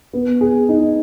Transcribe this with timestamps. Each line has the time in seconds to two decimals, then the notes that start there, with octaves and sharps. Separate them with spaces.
0.13 B3
0.41 G#4
0.69 D#4